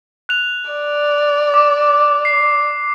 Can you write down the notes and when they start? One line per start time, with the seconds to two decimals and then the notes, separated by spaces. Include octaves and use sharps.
0.29 F#6 F7
0.71 D5
1.54 D6
2.25 C7